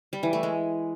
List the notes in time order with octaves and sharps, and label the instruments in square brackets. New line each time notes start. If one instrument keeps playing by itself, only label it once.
[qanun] G3
E3
A3
G#3